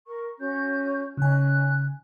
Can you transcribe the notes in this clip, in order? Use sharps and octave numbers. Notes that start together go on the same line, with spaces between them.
A#4 C#6
C#4 F#4 G6
C#3 C#4 D#4 G#5 F#6